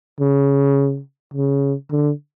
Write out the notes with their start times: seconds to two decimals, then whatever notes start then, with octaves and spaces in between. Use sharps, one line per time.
0.20 C#3
1.34 C#3
1.91 D3